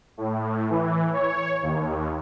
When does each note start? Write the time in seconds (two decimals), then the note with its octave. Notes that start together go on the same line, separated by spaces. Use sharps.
0.18 A2
0.70 E3
1.13 C#5
1.62 D#2